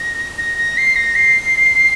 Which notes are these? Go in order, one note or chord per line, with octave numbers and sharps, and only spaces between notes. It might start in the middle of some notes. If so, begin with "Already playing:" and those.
Already playing: A#6
A#6
A#6
C7
A#6
C7